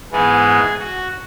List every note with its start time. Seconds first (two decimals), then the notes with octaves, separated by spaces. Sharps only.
0.12 G#2 E3 G#3 B3 G#4
0.79 F#4